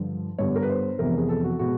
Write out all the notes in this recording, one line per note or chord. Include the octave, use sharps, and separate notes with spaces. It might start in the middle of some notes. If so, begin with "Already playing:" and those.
Already playing: G2 D3 F3
G2 D3 G3 B3 C#5
A#4
B4
C5
F2 C3 E3 G#3 B3 A#4
G#4
A4
F#4
B2 G#3 B3 F#4